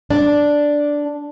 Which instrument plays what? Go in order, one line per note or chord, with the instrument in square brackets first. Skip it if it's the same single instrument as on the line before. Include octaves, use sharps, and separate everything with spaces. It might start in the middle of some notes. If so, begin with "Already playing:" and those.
[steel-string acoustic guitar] D4